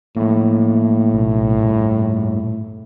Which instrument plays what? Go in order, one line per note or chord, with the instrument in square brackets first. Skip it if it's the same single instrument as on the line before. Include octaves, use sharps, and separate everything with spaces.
[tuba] A2 [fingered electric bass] F3 A3 A#3
[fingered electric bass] A#1 B2
G2 A#2